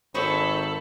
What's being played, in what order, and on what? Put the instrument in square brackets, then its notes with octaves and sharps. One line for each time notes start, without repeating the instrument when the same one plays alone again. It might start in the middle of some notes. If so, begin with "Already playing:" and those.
[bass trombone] G#1 [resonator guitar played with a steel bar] D#4 C5 C#5 [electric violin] A4 [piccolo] B5